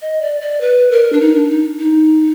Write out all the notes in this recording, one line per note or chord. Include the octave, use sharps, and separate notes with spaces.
D#5
D5
D5
B4
A#4
D4
D#4
D4
D#4
D#4